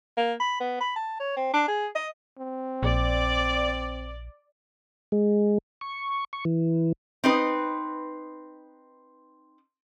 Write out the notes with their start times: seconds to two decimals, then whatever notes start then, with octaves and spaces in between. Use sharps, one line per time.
0.17 A#3
0.40 B5
0.60 B3
0.80 B5
0.96 A5
1.20 C#5
1.36 C4
1.53 D4
1.68 G#4
1.95 D#5
2.39 C4
2.83 A#1 D5
5.12 G#3
5.81 C#6
6.33 C#6
6.45 E3
7.24 C4 D#4 B4